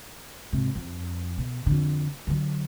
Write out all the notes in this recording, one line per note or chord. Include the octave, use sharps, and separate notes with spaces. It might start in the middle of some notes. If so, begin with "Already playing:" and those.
G#1 C3
F2
B2
F2 D3
D3 F#3